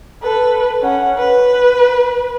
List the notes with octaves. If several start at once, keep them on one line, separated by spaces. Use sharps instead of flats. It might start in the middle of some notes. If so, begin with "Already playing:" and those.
A4 B4
C#4 F#5
B4